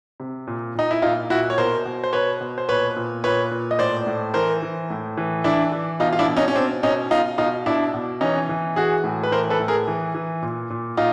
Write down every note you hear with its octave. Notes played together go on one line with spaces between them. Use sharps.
C3
A#2
A#2 D#4
E4
A#2 D#4 F4
A#2 E4 F#4
C#5
B2 A#4 C5
B2
C5
B2 B4 C#5
B2
C5
A#2 B4 C#5
A#2
A#2 B4 C#5
A#2
D#5
A2 C5 D5
A2
E3 A#4 C5
E3
A2
E3
E3 D4 E4
E3
B2 D#4 F4
F4
D4 E4
B2
C#4 D#4
C#4
B2 C4 D4
B2 C#4 D#4
B2 D#4 F4
B2 D#4 F4
B2 D4 E4
B2
E3 C#4 D#4
E3
E3 F#4 G#4
A2
B4
E3 A#4 C5
A4 B4
A2
G#4 A#4
E3
E3
A#2
A#2
A#2 D#4 F4